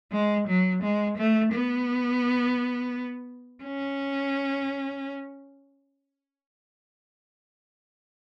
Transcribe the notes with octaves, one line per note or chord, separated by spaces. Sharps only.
G#3
F#3
G#3
A3
B3
C#4